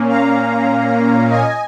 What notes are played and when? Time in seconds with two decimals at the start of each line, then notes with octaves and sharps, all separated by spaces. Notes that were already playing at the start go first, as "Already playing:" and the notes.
Already playing: A#2 A#3 C#4
0.09 F5 A#5
1.30 D#5 G#5